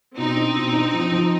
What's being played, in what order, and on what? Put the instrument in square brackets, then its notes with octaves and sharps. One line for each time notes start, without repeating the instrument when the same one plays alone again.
[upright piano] B2 [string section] C4 D#4
[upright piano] D4
B2
D4
F3
F3